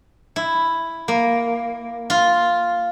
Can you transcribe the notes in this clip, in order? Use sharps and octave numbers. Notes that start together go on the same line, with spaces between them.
E4
A#3
F4